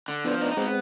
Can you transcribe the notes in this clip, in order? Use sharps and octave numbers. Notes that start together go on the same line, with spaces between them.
D3
F3 B3 D4
D#4
G#3 B3 C4